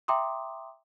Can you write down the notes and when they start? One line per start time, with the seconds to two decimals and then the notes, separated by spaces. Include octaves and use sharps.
0.08 E5 G5 A#5 C6 D6 D#6